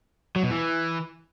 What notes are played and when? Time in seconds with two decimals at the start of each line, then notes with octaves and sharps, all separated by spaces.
0.36 F#3
0.43 B2
0.51 E3